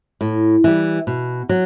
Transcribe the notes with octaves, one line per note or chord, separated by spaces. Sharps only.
A2
E3 G3
B2
F#3